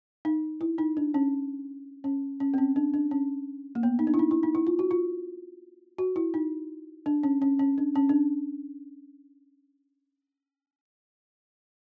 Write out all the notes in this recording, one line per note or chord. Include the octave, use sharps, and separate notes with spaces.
D#4
E4
D#4
D4
C#4
C#4
C#4
C4
C#4
D4
D4
C#4
A#3
B3
D#4
D4
E4
D#4
E4
D#4
E4
F4
F#4
F4
F#4
E4
D#4
D4
C#4
C#4
C#4
D4
C#4
D4